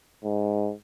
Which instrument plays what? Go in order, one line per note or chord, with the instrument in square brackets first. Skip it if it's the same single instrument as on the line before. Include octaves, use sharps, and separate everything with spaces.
[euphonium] G#2